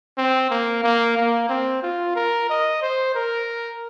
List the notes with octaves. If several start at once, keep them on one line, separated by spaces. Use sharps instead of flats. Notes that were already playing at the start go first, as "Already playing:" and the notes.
C4
A#3
A#3
A#3
C4
F4
A#4
D#5
C5
A#4